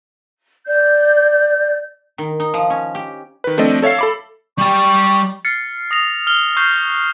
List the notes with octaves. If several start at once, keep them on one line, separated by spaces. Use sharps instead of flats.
D5 G6
D#3
D#4
F3
C#4
G4
D#3 B4
F3 A3 C4 D4 D5 D#5
A4 C#5 E5 F5 C7
A4 B5 D6
G3 G5 C#6
F6 A6 C7 C#7
D#6 A#6 F7
F6 G7
C#6 F#6 G6 C7 G7